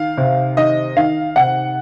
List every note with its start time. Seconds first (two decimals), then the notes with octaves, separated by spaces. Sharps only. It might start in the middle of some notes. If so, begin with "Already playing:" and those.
Already playing: D#3 F5
0.17 C3
0.57 D#3 D#5
0.97 D#3 F5
1.36 C3 F#5